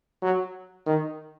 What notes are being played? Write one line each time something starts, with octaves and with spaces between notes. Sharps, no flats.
F#3
D#3